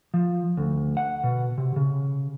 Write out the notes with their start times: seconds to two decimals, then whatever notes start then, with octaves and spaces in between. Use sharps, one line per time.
0.14 F3
0.57 D2
0.97 F#5
1.24 B2
1.58 C3
1.76 C#3